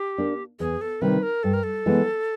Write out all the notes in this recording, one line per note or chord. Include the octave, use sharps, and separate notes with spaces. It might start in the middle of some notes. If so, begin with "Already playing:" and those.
Already playing: G4
A#3 D4
E2 G#4
A4
C3 D#3 G3 B4
A#4
G2 A4
A#4
A4
E3 G#3 B3